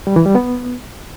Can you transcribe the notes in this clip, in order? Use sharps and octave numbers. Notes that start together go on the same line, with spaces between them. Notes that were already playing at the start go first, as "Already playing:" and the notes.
G3
E3
G3
B3